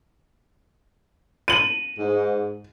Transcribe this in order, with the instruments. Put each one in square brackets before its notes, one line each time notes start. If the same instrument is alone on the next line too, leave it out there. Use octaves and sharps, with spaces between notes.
[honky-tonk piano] D#7 F#7
[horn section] G#2